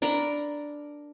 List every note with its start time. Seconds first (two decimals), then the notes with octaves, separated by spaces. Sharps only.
0.02 D4 A#4 A#5 B5